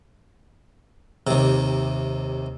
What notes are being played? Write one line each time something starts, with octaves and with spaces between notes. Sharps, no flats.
D#2 C3